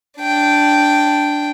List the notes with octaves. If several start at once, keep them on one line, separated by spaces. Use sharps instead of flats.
D4 G5